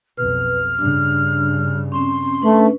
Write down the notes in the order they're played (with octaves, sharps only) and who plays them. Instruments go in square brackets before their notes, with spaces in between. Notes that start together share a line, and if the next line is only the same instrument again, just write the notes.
[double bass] B1 F2 [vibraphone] B4 [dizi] F6
[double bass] G2 C#3 [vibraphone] D4
[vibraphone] C4 C#4 [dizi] C6
[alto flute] A3 [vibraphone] C#4 D4 B4